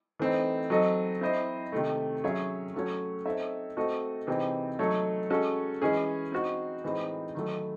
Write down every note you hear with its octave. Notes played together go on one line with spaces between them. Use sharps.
E3 A3 C4 D#4
F#3 C4 D#4 A4 D#5
C4 E4 C5 D#5
C3 D#3 A3
F#3 C#4 G#4 C#5 E5
F#3 A3 C#4 F#4 C#5
C4 D#4 A4 C#5 E5
A3 C4 F#4 A4 D#5
C3 E3 C4 D#4 G#4
F#3 A3 D#4 A4 C#5
G#3 C#4 F#4 A4
E3 G#3 C#4 G#4
C4 D#4 F#4
A2 E3 G#3 C4 D#4
D#3 F#3 A3